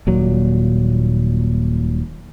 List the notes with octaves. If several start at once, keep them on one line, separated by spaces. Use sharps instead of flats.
D#1 A#2 F#3